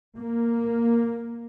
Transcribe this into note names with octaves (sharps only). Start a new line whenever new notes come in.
A#3